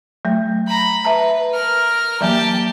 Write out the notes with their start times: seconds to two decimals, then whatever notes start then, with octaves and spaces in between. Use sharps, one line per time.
0.25 F#3 A3
0.68 A#5 B5
1.05 B4 E5 A5 A#5
1.53 A#4 F6
2.21 E3 F#3 A#3 G4 A5